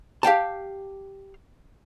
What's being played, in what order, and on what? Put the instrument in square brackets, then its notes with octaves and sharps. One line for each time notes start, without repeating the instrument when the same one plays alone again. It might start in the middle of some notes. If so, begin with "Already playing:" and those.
[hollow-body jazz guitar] G4 F5 G5 A5